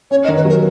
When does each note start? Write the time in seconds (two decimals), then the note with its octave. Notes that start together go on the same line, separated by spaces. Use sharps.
0.11 C#4 C#5
0.24 D#5
0.28 D#3
0.36 B4
0.45 F#3 A#4